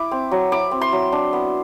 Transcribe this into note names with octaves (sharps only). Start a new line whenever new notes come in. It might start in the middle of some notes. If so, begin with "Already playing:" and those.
Already playing: E4 D6
C4
F#3
E4 D6
C4
C6
F#3
D4
B3